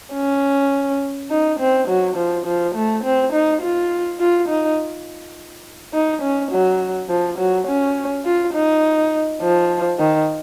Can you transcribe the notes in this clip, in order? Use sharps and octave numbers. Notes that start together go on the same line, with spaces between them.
C#4
D#4
C4
F#3
F3
F3
A3
C4
D#4
F4
F4
D#4
D#4
C#4
F#3
F3
F#3
C#4
F4
D#4
F3
D#3